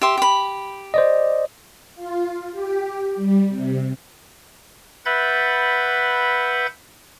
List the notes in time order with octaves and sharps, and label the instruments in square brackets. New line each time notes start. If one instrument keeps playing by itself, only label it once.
[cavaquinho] G4 E5 C6
G4 B5
[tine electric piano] C5 D5 D#5
[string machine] F4
G4
G3
C3
[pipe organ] B4 E5 F#5 B5 G6 A6